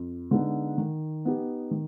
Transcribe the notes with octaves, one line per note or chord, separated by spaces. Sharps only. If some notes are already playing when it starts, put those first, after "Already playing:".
Already playing: F2
D3 G#3 B3 D#4
D#3
B3 D#4 G4
D#3